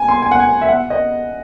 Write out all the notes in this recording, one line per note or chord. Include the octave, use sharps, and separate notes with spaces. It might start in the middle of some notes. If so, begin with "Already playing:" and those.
Already playing: G#5
C6
G#5
F#5
G#5
E5
F#5
D#5